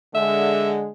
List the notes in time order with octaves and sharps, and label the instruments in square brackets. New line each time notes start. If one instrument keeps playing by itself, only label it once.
[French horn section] D3 G#3 [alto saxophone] E5